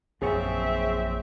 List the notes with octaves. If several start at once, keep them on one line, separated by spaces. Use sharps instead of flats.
A#1 F#2 A#2 C4 G#4 C#5 E5 C#6